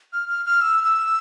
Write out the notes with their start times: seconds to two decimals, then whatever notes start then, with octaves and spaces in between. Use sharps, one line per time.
0.13 F6
0.29 F6
0.45 F6
0.61 E6
0.85 E6